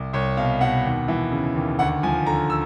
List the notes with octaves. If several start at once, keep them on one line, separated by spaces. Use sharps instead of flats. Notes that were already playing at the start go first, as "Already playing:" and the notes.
Already playing: C2
C2 C#5
B2 F5
B2 F#5
D#2
E3
C#3
D#2
D2 F#5
F3 G#5
D3 A#5
E6